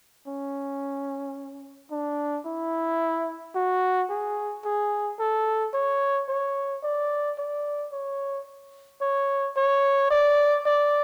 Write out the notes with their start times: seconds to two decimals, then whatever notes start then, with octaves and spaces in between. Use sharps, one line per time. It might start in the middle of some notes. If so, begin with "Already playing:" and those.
0.27 C#4
1.91 D4
2.46 E4
3.55 F#4
4.10 G#4
4.65 G#4
5.19 A4
5.74 C#5
6.28 C#5
6.83 D5
7.38 D5
7.92 C#5
9.01 C#5
9.57 C#5
10.11 D5
10.66 D5